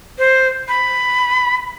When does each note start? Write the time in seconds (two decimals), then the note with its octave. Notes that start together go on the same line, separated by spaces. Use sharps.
0.18 C5
0.68 B5